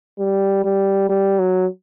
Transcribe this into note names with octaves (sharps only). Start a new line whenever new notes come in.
G3
G3
G3
F#3